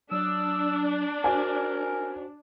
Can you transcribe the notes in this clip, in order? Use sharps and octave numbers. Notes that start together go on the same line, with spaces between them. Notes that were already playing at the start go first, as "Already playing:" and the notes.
F#3 D4 E6
F#4 A#4 C5 G#5